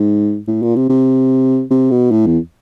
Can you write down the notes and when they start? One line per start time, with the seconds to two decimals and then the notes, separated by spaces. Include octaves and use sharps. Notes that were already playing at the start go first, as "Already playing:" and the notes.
Already playing: G#2
0.48 A2
0.62 A#2
0.76 C3
0.90 C3
1.71 C3
1.91 B2
2.11 A2
2.26 E2